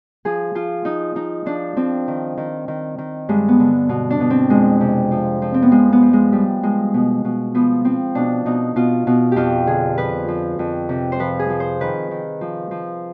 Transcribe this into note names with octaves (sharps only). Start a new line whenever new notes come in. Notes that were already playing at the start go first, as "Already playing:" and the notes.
F3 G#4
F3 F4
F3 D#4
F3 D#4
F3 D4
F3 C4
D#3
D#3
D#3
D#3
G2 G#3
B3
D3
B2
D4
B2
C4
F2 G#3
C3
F3
F3
C4
B3
F3 G#3
B3
F3
G#3
F3 G3
F3 G#3
B2
B2
F3 B3
F3 C4
B2 D4
B2 D#4
B2 F4
B2
F2 F4 G4
D3 G#4
F3 B4
F3
F2
C3
C5
F3 B4
G#4
F3
C5
D#3 B4
D#3
F3
F3